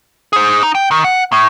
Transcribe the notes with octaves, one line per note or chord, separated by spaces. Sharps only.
G#4 C5
D#4
G5
D#3
F#5
A2